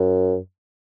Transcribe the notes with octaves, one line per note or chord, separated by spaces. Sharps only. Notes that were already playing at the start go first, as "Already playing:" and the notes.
Already playing: F#2